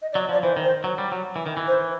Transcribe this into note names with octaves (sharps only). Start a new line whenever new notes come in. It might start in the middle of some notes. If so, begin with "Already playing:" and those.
D#5
D5
F#3
F3 D5
E3 C5
D#3
C5
F#3
G3
F#3
E3
D#3
E3
C5